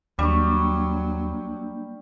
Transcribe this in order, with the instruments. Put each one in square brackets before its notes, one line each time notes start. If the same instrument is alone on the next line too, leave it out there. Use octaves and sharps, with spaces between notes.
[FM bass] D#2 [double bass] F#3 [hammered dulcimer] G3 C#6 [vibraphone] A#3 D4